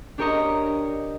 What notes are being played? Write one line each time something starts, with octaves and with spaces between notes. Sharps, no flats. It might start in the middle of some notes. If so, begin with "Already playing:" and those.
D4 G4 A#4 C#5 D#5 A#5